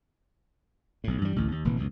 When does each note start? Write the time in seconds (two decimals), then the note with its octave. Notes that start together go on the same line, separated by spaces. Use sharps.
1.04 B1 A2
1.21 G2 E3 F3 G3
1.36 A1 D2 A2
1.51 D#2
1.65 F1 A#2 D#3 E3
1.77 C#2 F#2 B2